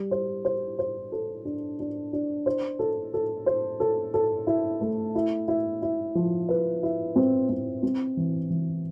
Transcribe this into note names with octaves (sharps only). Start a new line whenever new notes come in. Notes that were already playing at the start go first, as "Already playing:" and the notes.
Already playing: G3
C5
C5
C5
A4
D4
D4
D4
C5
A4
A4
C5
A4
A4
E4
A3
E4
E4
E4
F3
B4
E4
C4
C4
C4
E3
E3